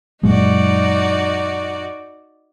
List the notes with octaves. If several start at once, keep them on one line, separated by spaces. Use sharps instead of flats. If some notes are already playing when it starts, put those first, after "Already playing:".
F#2 A#2 G#3 D#4 F#4 D5